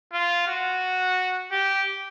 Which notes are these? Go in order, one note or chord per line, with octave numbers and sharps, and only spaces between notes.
F4
F#4
G4